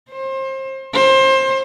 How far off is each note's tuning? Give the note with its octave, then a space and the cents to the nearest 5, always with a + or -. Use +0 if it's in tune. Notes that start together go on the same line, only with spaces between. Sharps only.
C5 +30
C5 +25